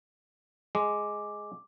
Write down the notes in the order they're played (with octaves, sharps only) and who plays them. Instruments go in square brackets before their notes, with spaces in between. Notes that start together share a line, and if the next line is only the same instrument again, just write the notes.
[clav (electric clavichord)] G#3 [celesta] D6